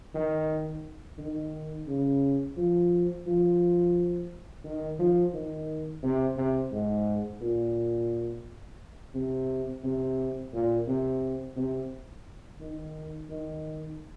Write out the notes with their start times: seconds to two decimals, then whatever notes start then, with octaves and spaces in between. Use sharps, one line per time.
0.14 D#3
1.18 D#3
1.87 C#3
2.57 F3
3.26 F3
4.64 D#3
4.99 F3
5.34 D#3
6.03 C3
6.37 C3
6.72 G#2
7.41 A#2
9.14 C3
9.84 C3
10.53 A#2
10.87 C3
11.56 C3
12.60 D#3
13.30 D#3